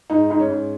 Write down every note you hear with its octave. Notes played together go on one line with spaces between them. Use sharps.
G#2 D#4
G#2 D#4
C#4
G#2